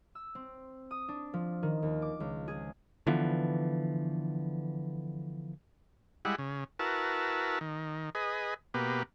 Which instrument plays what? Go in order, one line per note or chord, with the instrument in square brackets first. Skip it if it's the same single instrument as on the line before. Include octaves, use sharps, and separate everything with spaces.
[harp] E6
C4
D#6
D4
F3
D#3
D#2
D6
C#2
G#4
[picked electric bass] D3 E3 F3 B3
[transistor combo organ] G3 G#3 E4 F#5
C#3
E4 F#4 A#4 B4 A5
D#3
G#4 B4 D#5
B2 A#3 G4 B4